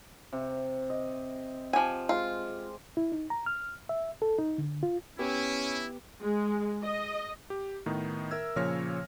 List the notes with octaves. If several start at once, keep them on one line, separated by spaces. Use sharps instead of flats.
C3
D#5
F3 G4 C5 G#5
G#3 F4
E4
D#4
A#5
F6
E5
A4
D#4
D3
F4
B3 C#4 E4 G4
G#3
D#5
G4
A2 D#3 B3 D#4
A#4 E5 E6 G#6
A#2 C#3 F3 C#5 F6 A#6